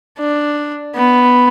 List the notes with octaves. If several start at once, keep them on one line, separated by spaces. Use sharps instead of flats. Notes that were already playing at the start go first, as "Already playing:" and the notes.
D4
B3